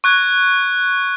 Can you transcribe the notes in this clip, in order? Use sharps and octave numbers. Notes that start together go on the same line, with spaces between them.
C#6 F#6 G#6